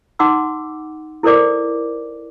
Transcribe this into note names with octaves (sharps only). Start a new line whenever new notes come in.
D#4 F#5 C6 D6 E6
E4 A4 A#4 C5 D5 D6